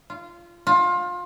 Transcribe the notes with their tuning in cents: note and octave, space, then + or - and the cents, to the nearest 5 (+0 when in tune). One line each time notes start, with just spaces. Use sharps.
F4 -20
F4 +25